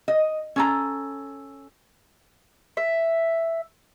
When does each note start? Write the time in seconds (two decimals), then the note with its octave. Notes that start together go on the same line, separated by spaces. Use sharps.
0.08 D#5
0.56 C#4 A4 A#5
2.77 E5